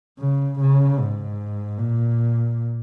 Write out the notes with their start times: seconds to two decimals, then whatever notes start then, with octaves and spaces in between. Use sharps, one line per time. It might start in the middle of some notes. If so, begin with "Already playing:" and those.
0.19 C#3
0.60 C#3
0.99 G#2
1.78 A#2